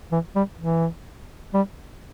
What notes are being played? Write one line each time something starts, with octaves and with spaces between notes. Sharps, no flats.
E3
G3
E3
G3